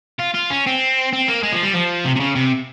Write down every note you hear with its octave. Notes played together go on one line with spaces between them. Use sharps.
F4
F4
C#4
C4
C4
A#3
G#3
F3
G3
F3
C3
C3
C#3
C3